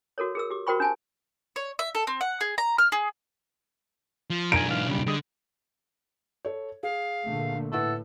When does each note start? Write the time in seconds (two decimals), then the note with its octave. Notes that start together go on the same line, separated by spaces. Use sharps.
0.18 F#4 A4 A#4 C#5
0.35 G#4 A#4 E6
0.50 G4 D6
0.67 F#4 A#4 C5 G5 B5 C#6
0.80 D4 G#5 A5
1.56 C#5
1.79 E5
1.95 A4
2.07 C4
2.21 F#5
2.41 G#4
2.58 A#5
2.78 F6
2.92 G#4
4.30 F3
4.52 B1 D4 F4 A#4 G#5 D7
4.67 G#2 E3 F5
4.87 C#3 G3
5.06 D3 G3 G#4 D#5
6.45 A4 C#5
6.83 G#4 F5
7.28 A#2 D3 A3
7.72 A2 E4 A4 B4 F#5